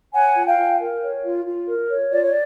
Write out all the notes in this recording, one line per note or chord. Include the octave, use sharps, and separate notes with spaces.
C#5 F#5 G#5
F4
F5 G5
F4
A#4
C#5
F4
F4
A#4
C#5
F4 D5
C#5
D5